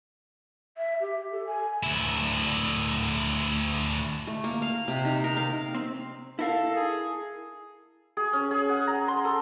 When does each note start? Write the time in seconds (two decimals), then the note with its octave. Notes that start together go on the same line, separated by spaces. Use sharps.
0.78 E5
1.01 G4
1.32 A4
1.47 G#5
1.83 D2 E4
4.27 A3
4.44 A#3
4.62 F5
4.88 C3
5.05 D#4
5.24 A#4
5.37 F5
5.75 C4
6.39 E4 A4 A#4 F5
6.76 G#4
8.17 G#4
8.33 C#4
8.51 G#4
8.69 F#5
8.87 A#5
9.08 C6
9.25 A4